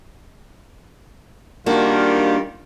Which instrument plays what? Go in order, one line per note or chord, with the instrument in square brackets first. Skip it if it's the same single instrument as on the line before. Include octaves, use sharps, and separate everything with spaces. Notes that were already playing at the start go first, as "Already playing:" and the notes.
[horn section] D#3 G3 F4 [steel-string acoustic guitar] A#3 D4 F#4